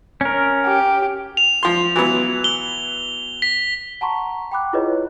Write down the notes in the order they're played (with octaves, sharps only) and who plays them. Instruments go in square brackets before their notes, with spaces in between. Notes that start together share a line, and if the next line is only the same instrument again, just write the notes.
[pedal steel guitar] C#4 A#4
[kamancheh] G4
[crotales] F7
[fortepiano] F3 C6
E3 F#3 B3
[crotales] G7
B6
[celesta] F#5 A5 A#5 C6 C#6
G5 B5 D6 F#6
E4 F4 G#4 B4 C#5 D#5